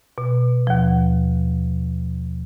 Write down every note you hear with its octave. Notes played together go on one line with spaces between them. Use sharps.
B2
D#2 F3